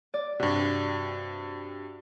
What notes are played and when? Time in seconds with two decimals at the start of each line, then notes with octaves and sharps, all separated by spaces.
0.14 D5
0.40 G2 C3 F#4